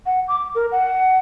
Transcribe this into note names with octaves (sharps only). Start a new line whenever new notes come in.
F#5
D6
A#4
F#5